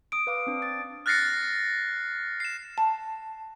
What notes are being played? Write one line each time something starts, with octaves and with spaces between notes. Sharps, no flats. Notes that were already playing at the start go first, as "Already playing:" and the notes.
D#6 D7
B4 F5 D6
C4 D4
A6
F6 F#6 A6 A#6 C7 C#7
C7 E7
A5